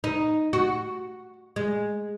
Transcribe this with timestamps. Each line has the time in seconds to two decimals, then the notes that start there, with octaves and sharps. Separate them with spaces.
0.04 D#4
0.53 F#4
1.56 G#3